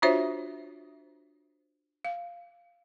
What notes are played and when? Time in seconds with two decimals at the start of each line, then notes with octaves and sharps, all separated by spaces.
0.02 D4 F4 F#4 C5 C#5 E5
2.05 F5